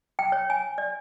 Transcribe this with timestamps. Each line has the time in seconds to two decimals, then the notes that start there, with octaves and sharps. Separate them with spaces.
0.19 G5
0.32 C#5
0.50 G#5
0.78 D5